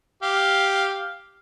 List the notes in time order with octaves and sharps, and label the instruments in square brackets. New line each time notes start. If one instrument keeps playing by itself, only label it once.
[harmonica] G4 F5